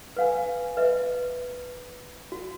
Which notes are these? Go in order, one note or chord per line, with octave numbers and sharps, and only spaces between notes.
B4 F5 G#5
B4 D#5 E5
F#4